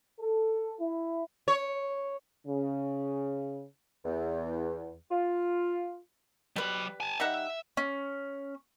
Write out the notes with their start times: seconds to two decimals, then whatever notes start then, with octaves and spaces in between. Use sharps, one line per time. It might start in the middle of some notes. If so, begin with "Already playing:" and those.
0.19 A4
0.80 E4
1.48 C#5
2.46 C#3
4.05 E2
5.10 F4
6.56 F#3 G3 B4 B5
7.00 G#5 A5
7.20 G3 D#4 E5 F#5
7.77 C#4